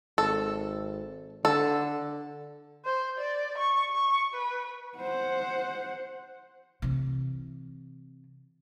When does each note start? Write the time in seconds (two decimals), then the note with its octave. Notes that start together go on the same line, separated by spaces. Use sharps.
0.18 G#1 A4
1.45 D3 A4
2.85 C5
3.18 D5
3.58 C#6
3.91 C#6
4.34 B4
4.98 C5 F#5
6.82 C3 E3